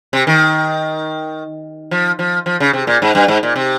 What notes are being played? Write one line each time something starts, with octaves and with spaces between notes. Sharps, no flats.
C3
D#3
F3
F3
F3
C#3
C3
A#2
G#2
G2
G#2
A#2
C3